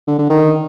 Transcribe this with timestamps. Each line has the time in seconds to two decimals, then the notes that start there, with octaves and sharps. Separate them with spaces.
0.07 D3
0.18 D3
0.29 D#3